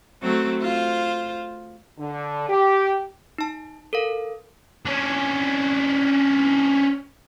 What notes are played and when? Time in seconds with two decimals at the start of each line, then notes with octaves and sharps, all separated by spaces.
0.22 F#3 A3 C4
0.62 F4 C5
1.98 D3
2.48 G4
3.38 D#4 A5
3.93 A4 A#4 F5
4.86 C#4 D4